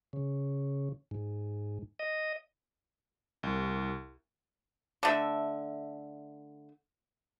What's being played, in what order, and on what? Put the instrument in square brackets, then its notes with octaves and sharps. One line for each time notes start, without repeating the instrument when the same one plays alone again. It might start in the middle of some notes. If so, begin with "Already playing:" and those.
[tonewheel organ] C#3
G#2
D#5
[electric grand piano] C2
[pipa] D3 A3 E5